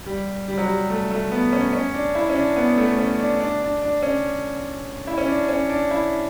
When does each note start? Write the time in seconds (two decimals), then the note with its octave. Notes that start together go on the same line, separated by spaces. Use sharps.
0.06 G3
0.48 G3
0.58 F#3
0.67 G3
0.90 A3
1.11 A3
1.32 B3
1.53 C#4
1.73 C#4
1.94 D4
2.15 E4
2.30 C#4
2.35 D4
2.56 B3
2.77 A3
2.98 C#4
3.19 D4
3.40 D4
3.61 D4
3.82 D4
4.02 C#4
5.07 E4
5.18 C#4
5.28 D4
5.49 C#4
5.69 D4
5.91 E4